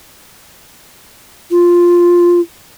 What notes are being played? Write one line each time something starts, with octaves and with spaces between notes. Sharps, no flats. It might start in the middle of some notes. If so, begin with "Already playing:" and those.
F4